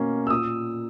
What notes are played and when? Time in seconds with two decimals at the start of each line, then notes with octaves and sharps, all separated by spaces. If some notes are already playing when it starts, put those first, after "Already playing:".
Already playing: B2 A#3 C#4
0.27 E6
0.30 A#2 D#6